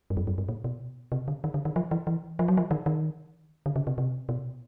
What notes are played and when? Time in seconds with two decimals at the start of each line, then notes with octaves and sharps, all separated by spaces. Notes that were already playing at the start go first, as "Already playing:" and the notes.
0.10 G2
0.17 F#2
0.27 F#2
0.38 G2
0.49 A#2
0.64 B2
1.12 C3
1.28 D3
1.44 D#3
1.54 D3
1.65 D#3
1.76 F3
1.91 E3
2.07 E3
2.39 F3
2.48 F#3
2.57 F3
2.71 D#3
2.86 D#3
3.66 D3
3.76 C#3
3.87 C3
3.98 C3
4.29 B2